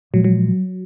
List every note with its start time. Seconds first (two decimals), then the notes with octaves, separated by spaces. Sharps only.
0.13 A#2 F3 F#3 G#3
0.24 F#3